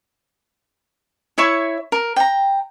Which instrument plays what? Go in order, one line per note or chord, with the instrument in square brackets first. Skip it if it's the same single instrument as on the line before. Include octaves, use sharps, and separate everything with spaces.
[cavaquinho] E4 C#5 E5 C#6
A#4
G5 A#5